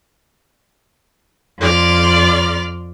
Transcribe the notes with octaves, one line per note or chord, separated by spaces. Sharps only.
F2 D5 C6 F6